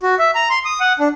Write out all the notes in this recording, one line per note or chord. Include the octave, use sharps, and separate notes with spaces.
F#4
E5
A#5
C6
D#6
F#5
D4